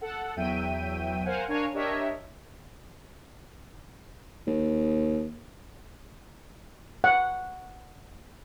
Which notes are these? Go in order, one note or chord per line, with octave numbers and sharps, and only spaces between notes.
A4 F#5
E2 F#3 E5 G5 D#7
A#4 C5 F5 F#5 G#5
D4 A#4 C#5 F5 G#5
D4 G4 A#4 C#5 D#5 E5
D#2
F#5